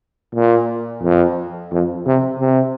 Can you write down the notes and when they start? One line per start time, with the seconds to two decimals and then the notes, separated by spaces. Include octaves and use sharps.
0.35 A#2
1.03 F2
1.71 F2
2.06 C3
2.40 C3